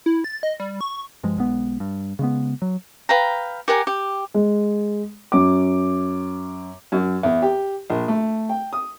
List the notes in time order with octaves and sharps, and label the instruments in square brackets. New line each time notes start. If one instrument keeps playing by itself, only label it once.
[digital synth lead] E4
A6
D#5
G3
C#6
[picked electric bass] G2 F3 G#3
B1 G#3 B3
G2
C#3 G#3 B3
F#3
[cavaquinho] B4 F5 G5 A#5
G4 A#4 F#5 G#5
G4
[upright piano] G#3
F#2 D6
[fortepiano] F#2
E2
G4
A#1
A3
G5
D#6